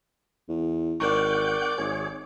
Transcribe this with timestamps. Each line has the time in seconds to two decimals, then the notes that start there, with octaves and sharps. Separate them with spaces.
0.48 E2
1.00 G#1 A#4 D5 F#5 G5 C#6
1.78 G#1 G#4 C#5